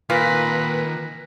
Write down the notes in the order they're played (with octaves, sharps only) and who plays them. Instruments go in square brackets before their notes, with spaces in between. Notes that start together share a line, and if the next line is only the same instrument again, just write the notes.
[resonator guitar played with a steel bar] A#2 [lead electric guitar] D#3 C6 [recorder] B4 [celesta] F6 A#6 B6